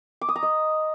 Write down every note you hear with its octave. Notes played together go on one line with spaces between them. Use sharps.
D6
D#6
A#5
D#5